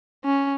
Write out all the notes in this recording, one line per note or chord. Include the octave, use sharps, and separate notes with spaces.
C#4